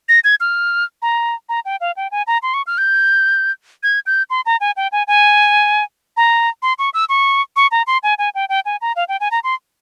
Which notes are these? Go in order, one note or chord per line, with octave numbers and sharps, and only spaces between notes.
A#6
G#6
F6
A#5
A#5
G5
F5
G5
G#5
A#5
C6
C#6
F6
G6
G#6
G6
C6
A#5
G#5
G5
G#5
G#5
A#5
C6
C#6
E6
C#6
C#6
A#5
C6
G#5
G#5
G5
G5
G#5
A#5
F5
G5
G#5
A#5
C6